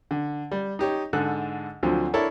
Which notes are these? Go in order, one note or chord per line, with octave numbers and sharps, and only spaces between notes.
D3
G3
D#4 G4 C#5
G#2 D3 A4 F#6
D2 D3 F3 F#3 C4
D4 E4 A4 A#4 C#5